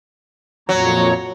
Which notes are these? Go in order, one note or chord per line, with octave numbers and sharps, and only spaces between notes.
F2 A#2 F#3 C#5 A#5